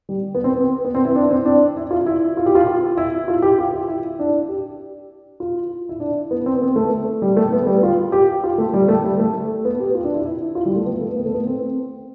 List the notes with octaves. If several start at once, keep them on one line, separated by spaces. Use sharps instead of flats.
G3
B3
C4
B3
B3
C4
E4
D4
C4
D4
E4
F4
E4
F4
G4
F4
F4
E4
F4
G4
F4
E4
E4
D4
G4
F4
E4
D4
B3
C4
B3
A3
G3
A3
B3
G3
F4
G4
F4
A3
G3
A3
G3
A3
B3
G4
F4
D4
E4
E4
F4
G3
A3
B3
A3
B3
A3
B3
C4